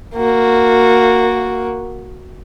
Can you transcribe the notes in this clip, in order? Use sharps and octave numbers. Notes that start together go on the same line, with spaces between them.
A#3 F#4